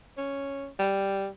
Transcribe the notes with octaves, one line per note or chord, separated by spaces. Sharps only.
C#4
G3